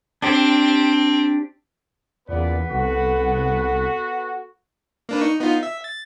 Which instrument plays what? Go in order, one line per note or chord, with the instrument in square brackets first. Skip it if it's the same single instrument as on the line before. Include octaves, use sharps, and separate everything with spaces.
[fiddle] C4 [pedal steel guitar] D4 G4
[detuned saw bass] E2 [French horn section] A#2 C#3 D5 [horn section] B3 B4
[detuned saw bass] C2 [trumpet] F#4 [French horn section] A4
[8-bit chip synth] A#3 D4 B4
D#4 C#6
B3 D#4 F4
E5
A6